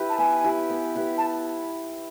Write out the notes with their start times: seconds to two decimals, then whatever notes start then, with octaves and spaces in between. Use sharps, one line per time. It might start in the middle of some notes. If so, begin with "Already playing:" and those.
Already playing: E4 G4 B4
0.09 A5
0.18 B3 G#5
0.44 E4 G4 B4
0.70 B3
0.95 E4 G4 B4
1.17 A5